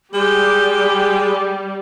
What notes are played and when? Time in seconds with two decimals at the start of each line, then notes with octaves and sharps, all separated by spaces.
0.14 G3 G#3 G4